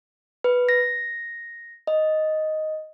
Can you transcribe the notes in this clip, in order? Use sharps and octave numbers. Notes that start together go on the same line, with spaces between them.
B4
A#6
D#5